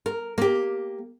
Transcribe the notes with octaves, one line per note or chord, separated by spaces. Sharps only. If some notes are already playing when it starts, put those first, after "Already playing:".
A#4
A#3 G4